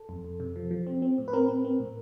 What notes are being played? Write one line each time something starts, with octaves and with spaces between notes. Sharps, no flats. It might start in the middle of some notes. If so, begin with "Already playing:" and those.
Already playing: A4
F2
F2
C3
F3
F3
C4
C4
A2
B4
C4 A#4
C4
C4
A2